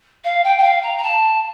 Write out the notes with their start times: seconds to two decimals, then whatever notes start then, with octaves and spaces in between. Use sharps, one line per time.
0.24 F5
0.44 G5
0.58 G5
0.63 F5
0.82 A#5
0.97 A#5
1.03 A5